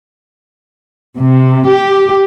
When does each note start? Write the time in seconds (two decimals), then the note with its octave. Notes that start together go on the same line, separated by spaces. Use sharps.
1.18 C3
1.69 G4